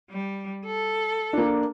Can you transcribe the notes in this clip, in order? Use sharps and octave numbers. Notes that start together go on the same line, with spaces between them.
G3
A4
A#3 D4